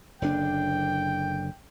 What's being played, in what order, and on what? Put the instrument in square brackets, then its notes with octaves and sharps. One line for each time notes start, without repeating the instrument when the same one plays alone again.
[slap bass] F#1 D3 D4 [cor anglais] G5